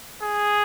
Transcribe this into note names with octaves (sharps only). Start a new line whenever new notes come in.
G#4